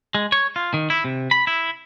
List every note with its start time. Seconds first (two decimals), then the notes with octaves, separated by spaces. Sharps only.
0.15 G#3
0.32 C#5
0.56 F4
0.74 D#3
0.90 E4
1.05 C3
1.31 B5
1.47 E4